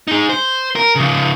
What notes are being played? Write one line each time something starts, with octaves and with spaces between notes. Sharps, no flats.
D#4 G#4
C5
A#4
C#3 F3